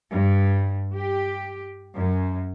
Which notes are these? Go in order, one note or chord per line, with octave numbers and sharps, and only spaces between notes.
G2
G4
F#2